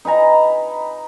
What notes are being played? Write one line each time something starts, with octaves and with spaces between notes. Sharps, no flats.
D#4 B4 G#5 A#5